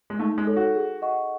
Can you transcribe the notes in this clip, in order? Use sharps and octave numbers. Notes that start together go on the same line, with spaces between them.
G#3
A3 D#4
G#3
A4 C#5
F#4
G#4
D#5 F#5 C#6